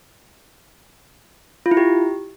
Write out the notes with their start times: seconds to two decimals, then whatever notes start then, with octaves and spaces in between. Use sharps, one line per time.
1.66 F4
1.71 E4
1.77 G4